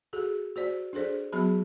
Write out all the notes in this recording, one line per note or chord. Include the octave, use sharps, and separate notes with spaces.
F#4 G#4 A4
F#4 C5 D5
D4 G#4 A4 C5 D5
F#3 B3 F#4 G#4 B5